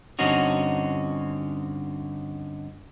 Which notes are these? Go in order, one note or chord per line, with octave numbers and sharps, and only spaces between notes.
G2 D3 C4 C#4 D#4 F#4